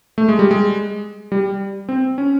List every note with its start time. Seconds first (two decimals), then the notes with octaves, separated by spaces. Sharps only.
0.18 A3
0.28 G#3
0.39 G3
0.51 G#3
1.32 G3
1.89 C4
2.18 C#4